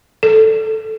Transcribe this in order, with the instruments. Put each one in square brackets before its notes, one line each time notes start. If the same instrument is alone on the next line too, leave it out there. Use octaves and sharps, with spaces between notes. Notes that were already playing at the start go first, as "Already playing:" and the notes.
[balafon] A4